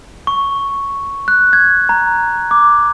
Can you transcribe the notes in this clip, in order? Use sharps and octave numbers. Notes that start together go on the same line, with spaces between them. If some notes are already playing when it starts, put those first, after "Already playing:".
C#6
F#6
G#6
A#5
D6